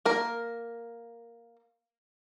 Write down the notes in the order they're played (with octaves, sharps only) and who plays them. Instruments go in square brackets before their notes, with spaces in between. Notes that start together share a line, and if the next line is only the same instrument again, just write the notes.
[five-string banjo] A#3 A#4